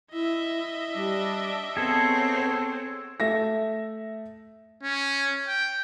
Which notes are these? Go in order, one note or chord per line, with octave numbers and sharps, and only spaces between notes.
E4 D#5 E5
G3 D4
B3 C4 G#4 A4 C#5
A3 E5 A#6
C#4
G5